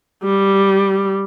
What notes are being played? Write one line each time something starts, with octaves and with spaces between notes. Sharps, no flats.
G3